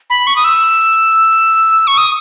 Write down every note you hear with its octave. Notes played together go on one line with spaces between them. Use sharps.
B5
C#6
D#6
E6
C#6
D#6